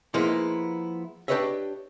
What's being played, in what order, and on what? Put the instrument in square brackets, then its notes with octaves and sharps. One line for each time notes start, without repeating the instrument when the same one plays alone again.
[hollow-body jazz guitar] F3 G#3 A#3 B3 D#4 E4
D4 G4 B4 C#5 D#5 E5